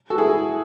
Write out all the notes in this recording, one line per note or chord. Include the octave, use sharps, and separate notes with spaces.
F#4 A4
E4 G#4